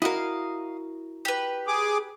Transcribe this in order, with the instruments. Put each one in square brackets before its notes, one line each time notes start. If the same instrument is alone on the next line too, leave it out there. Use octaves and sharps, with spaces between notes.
[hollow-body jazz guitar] E4 F#4 A#4 [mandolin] D#5 F5
[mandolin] G4 B4
[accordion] G#4 D6